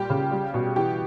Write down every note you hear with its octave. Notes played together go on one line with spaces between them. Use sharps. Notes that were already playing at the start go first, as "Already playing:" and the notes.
Already playing: A#2 G3 G4
C#3
G3
B2
E3 G4